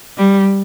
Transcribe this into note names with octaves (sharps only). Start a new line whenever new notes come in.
G3